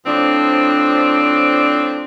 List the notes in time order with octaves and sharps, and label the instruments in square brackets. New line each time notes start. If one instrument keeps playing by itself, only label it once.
[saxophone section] A2 F3 C4 D4